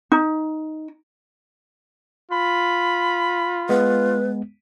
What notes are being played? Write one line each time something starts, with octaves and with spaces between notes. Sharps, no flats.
D#4
F4 B5
G#3 B3 B4